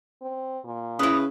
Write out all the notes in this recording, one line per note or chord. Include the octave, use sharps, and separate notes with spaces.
C4
A#2
C#3 E4 B4 D#6